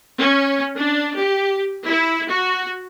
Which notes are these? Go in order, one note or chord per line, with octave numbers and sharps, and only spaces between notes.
C#4
D4
G4
E4
F#4